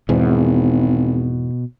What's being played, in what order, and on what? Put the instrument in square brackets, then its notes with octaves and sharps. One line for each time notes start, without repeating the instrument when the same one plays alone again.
[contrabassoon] G#1 [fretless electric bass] E2 G#2 [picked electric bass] B2